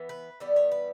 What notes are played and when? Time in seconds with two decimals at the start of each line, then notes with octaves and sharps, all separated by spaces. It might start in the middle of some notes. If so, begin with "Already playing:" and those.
Already playing: E3 B3
0.09 B4
0.40 E3 G3 B3 D5
0.56 C#5
0.71 B4